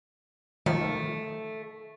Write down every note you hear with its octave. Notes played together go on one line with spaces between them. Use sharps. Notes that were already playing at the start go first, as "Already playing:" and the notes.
D#3 F3 A3